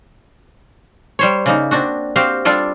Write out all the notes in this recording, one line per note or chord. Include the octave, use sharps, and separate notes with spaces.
G3 C5 C#5
C#3 A#3 D#4
C4 D4 F#4
C4 F#4 G4 F5
G3 D4 F4 A4 D5